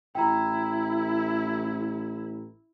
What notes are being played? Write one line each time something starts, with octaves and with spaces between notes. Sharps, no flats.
A1 E4 G5 A#5